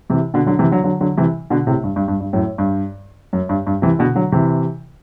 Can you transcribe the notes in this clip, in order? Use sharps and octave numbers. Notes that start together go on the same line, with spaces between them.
C3 E3
B2 D3
D3 F#3
C3 E3
D3 F#3
D3 F#3
D3 F#3
C3 E3
B2 D3
A2 C3
G2
G2
G2
G2
F#2 A2
G2
F#2
G2
G2
C3 E3
B2 D3
D3 F#3
C3 E3